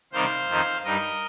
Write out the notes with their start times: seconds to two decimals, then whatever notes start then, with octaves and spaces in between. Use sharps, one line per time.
0.12 C3 D#3 G3 C4 D#4 C5 F5
0.48 F2 D#3 C4 D#4
0.84 G2 G3 D#4 A#4 D#5